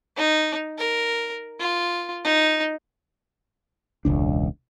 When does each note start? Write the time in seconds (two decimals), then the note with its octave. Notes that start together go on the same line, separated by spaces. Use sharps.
0.17 D#4
0.78 A#4
1.60 F4
2.25 D#4
4.05 E1 C#2 D4